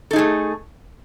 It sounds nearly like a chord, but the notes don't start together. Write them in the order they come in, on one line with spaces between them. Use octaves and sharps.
A4 D#4 G#4 A3